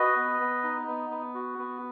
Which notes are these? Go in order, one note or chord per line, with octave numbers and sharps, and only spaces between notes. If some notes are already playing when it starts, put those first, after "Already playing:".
Already playing: F#4 B4 D#5
B3
B3
D#4
B3
B3
F#4
B3